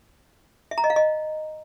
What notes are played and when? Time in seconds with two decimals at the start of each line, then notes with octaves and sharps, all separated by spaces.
0.71 E5
0.78 A#5
0.84 D#5
0.90 F5
0.96 D#5